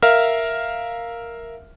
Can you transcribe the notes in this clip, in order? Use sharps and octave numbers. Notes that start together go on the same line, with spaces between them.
A#4 E5 F5 F6